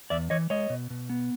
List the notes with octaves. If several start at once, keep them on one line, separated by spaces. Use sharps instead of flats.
E2 D5 E5
E3 C#5 D#5
G#3 C#5 D#5
B2
B2
B3